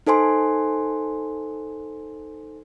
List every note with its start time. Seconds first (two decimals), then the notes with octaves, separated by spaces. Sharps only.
0.07 D#4 A4 C5 G#5 C6